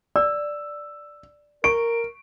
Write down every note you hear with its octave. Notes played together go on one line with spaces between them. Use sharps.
D5 E6
A#4 C#6 D7